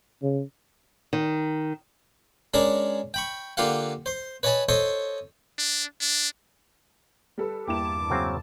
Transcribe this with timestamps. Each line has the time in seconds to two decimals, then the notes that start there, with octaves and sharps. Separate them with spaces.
0.23 C#3
1.13 D#3
2.54 G#3 C#4 D4 G#4 A#4 D5
3.14 G5 B5 C#6
3.57 D3 A#3 F4 G4 F5 F#5
4.06 C5 C6
4.43 B4 C#5 D#5 G#5 A5 B5
4.69 A4 C5 C#5 D#5 C#6 D#6
5.58 D4
6.01 D4
7.38 G3 A4 B4
7.68 E2 G2 A#3 E4 G4 A5 D6 E7
8.10 C#3 F#3 C4